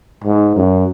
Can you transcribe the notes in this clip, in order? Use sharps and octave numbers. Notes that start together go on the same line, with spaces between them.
G#2
F#2